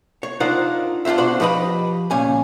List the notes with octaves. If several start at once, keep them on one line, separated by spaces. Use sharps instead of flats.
C#5
D4 D#4 F4 A#4 C5 F#5
D4 F4 G4 C5 E5
B2 D4 F#4 C5 F#5 C6
F3 G4 B4 D#5 B5
C#2 A#2 C#4 G#5